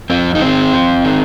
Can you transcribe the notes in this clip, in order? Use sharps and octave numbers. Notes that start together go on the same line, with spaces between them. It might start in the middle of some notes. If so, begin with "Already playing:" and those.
F2 C4
D#4
D#3 C4
F2
D#3